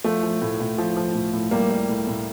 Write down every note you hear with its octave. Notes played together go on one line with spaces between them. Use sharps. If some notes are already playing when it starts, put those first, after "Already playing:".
F3 A3
F3
A2
A2
F3
F3
A2
A2
G3 A#3
G3
A2
A2